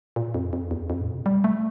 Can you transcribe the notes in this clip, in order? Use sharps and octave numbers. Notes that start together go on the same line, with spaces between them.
A#2
F2
F2
E2
F2
A2
A#2
C3
G3
A3